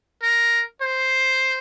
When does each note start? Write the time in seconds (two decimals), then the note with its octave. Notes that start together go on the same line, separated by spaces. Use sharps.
0.23 A#4
0.82 C5